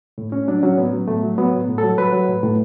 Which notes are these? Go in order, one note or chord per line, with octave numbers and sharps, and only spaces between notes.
A2
A2 C#4
F#3 D4
F#3 C#4
A2 B3
F#3
A2 A3
F#3
F#3 B3
A2
A2
F#3 A4
F#3 B4
F#3
A2
A2